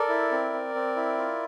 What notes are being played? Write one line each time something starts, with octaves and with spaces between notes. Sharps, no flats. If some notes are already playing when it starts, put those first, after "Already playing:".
Already playing: A4 A#4 D5
E4
C4
C4
C4
E4
F4